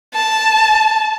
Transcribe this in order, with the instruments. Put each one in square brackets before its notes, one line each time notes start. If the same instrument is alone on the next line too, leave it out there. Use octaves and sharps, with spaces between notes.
[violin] A5